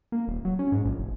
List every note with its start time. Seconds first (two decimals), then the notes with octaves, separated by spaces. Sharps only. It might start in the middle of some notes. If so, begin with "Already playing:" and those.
0.12 A#3
0.28 D#1
0.45 F#3
0.59 C#4
0.72 G#2
0.85 A#1
0.98 F1